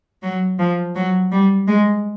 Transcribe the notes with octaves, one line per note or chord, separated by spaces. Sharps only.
F#3
F3
F#3
G3
G#3